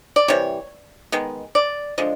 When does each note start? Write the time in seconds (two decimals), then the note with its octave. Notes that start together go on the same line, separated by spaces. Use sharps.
0.16 D5
0.28 C3 E3 G3 C#5
1.12 D#3 G#3 B3
1.55 D5
1.98 D3 F3 G#3 D#5